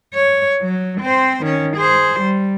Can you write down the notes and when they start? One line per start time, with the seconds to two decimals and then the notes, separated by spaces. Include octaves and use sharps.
0.14 C#5
0.62 F#3
1.01 C4 C5
1.43 D#3 C#4
1.77 G#4 C5
2.20 G3